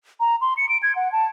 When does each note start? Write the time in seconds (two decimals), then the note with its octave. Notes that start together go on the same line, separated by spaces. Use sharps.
0.20 A#5
0.41 C6
0.57 C#7
0.69 D7
0.83 G#6
0.96 F#5
1.12 A5